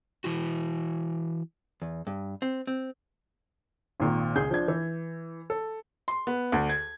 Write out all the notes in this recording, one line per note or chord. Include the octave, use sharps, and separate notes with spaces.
E3 E4 F#4
E2
G2
C4
C4
G#1 A#2 D#3
C#2 G#4 G6
F3 D4 G#6
E3
A4
C6
B3
D2
G#6